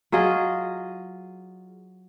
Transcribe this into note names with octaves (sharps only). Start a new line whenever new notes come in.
F#3 F4 G#4 D#5